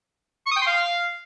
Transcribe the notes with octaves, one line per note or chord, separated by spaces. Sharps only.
C#6
D#6
G5
C6
F5